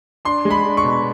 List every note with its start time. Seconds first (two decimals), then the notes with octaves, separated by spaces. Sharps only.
0.25 D4 C6
0.45 G#3
0.51 B5
0.64 D4
0.77 C#6
0.83 B2